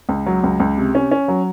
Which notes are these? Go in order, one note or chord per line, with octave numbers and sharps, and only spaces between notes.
C#2
F#3
C#2
C#2
C3
C#4
C#4
F#3